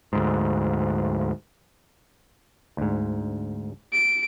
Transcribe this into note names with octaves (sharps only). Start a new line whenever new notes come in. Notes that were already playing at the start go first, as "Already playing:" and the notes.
D2 G#2
D2 G#2
D7